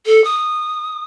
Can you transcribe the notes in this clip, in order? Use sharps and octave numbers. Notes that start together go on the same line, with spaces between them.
A4
D#6